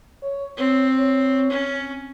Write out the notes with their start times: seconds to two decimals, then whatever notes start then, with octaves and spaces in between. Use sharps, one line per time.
0.22 C#5
0.57 C4 C#5
0.99 C#5
1.50 C#4